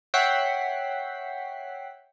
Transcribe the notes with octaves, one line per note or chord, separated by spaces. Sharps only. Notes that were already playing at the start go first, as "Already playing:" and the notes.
C#5 E5 F#5 G5 B6 C7